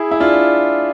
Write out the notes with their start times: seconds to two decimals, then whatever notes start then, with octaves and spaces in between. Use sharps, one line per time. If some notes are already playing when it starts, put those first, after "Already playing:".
Already playing: E4 G#4
0.11 E4
0.20 D4 F4